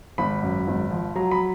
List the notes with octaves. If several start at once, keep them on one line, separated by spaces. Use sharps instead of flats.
G#1 B5
F#2
G#1
F3
F#3 A#5
B5